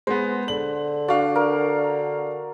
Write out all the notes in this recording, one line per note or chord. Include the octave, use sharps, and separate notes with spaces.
G#3 B3 C5
D3 F#7
D4 F#4 F5
A#4